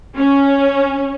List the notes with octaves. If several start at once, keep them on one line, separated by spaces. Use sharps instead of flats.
C#4